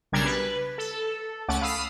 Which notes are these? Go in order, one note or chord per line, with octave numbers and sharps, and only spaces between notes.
B1 C#3 G3 D4 A#4 G#6
B4
A4
C#2 A3 C#4 F#5 D6 A6
F5 B5 D#6 E6 C7 D#7